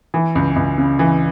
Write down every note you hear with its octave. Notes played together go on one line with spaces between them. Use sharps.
E3
C#2
C#2
C#3
E3